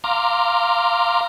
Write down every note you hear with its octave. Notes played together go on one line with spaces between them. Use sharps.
F5 A#5 C6 D6